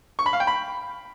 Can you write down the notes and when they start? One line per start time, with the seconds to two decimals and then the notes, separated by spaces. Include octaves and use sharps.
0.19 C#6
0.26 B5
0.33 F5
0.40 G5
0.47 B5